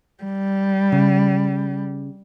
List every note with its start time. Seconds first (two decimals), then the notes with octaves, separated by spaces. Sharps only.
0.24 G3
0.92 C#3